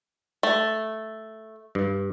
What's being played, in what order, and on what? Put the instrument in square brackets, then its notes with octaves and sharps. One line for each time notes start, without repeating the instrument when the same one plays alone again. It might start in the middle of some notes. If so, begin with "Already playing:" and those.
[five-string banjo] A3
[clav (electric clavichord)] G2